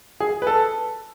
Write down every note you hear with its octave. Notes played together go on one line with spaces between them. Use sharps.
G#4
B4
A4